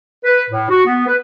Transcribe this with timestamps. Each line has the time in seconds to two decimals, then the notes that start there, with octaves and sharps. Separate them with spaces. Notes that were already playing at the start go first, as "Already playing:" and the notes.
0.24 B4
0.50 A2
0.70 F#4
0.86 B3
1.07 B4